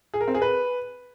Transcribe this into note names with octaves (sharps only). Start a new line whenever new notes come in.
G#4
A#4
C4
G#4
B4